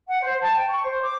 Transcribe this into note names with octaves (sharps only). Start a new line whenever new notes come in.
F#5
C5
A5
G5
C#6
C5
D6